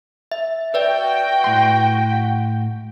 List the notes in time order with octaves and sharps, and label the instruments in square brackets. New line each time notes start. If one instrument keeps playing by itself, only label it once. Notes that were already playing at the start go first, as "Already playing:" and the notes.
[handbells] E5
[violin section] F#4 G5 [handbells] B4 D5 E5
[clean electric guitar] A2 C6
[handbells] F#5